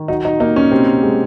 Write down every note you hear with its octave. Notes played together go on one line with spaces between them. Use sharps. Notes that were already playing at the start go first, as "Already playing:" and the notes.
Already playing: D#3
F#3 D#4
D#4
A#3 D#4
C#4
C3 C4
G#3